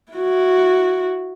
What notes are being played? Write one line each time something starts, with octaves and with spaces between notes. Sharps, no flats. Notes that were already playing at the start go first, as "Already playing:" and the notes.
E4 F#4